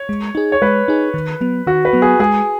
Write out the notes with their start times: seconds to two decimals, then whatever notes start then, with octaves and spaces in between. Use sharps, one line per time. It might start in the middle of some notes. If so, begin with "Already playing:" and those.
Already playing: C#5
0.09 G#3
0.35 D#4 G#4
0.52 C#5
0.62 G#3 B4
0.88 D#4 G#4
1.14 D#3
1.41 F#3 B3
1.67 D#3 F#4
1.85 B4
1.93 F#3 B3
2.02 G#4
2.20 G#3 G#4